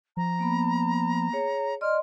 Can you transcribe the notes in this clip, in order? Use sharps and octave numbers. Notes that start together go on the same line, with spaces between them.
F3 A#5
A#3 B3 B5
G#4 C#5
D5 D#5 C6 F6